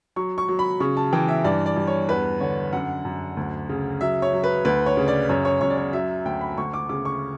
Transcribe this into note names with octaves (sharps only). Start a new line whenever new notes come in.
F#3 C#6
C#6
F#3
B5
C#3 C#6
A5
E3 G5
E5
G2 D5
D5
G2
C#5
E2 B4
D3 C#5
F#2 F#5
F#2
D2
C#3
F#3 E5
C#5
F#3
B4
D2 B4
C#5
C#3
D5
F#2 C#5
C#5
F#2 C#5
D5
C#5
F#3 E5
D2 G5
B5
D2 C#6
D6
C#3 D6
C#6